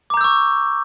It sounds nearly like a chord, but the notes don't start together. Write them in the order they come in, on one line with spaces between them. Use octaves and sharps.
D6 A#5 G6 E6 C#6